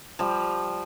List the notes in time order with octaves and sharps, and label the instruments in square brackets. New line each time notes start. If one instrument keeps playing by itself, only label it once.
[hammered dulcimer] F3 G3